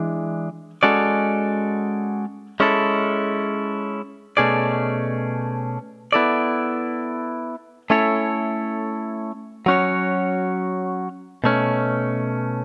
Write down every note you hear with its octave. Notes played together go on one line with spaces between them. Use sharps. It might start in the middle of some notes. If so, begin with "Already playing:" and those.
Already playing: E3 G#3 D4
G#3 C#4 F#4 A4 D5
G#3 C#4 E4 A4
B2 A3 C#4 G#4 D5
B3 E4 A4 D5
A3 C#4 E4 A4 C#5
F#3 C#4 F#4 C#5
B2 A3 C#4